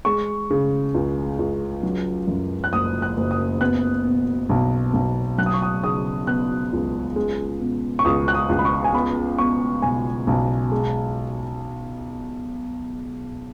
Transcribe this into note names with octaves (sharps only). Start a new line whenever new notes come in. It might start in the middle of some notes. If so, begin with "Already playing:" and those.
G#3 C#6
C#3
C#2
C#2
F#3
F#2
F#6
F#1 D#6
F#6
F#1
D#6
B3 F#6
B2
B1
B1
F#3 F#6
D#6
C#6
D#6
C#3 D#6
B3 F#6
C#2
G#3
B2
C#6
C#2 D#6
F#6
D#6
C#2
B5
C#6
G#5
B3 B5
B2 C#6
B1 G#5
B1
G#3